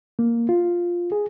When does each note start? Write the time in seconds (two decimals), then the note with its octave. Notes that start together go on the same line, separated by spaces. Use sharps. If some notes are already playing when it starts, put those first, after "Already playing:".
0.19 A#3
0.49 F4
1.12 G#4